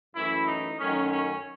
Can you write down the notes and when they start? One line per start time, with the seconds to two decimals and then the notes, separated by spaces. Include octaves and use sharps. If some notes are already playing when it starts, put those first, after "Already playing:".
0.15 F#2 E3 A3 E4
0.47 D#4
0.80 F#2 D#3 F#3 A3 C#4
1.11 C#4